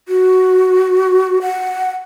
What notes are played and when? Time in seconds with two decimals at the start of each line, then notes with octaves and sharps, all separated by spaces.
0.08 F#4
1.42 F#5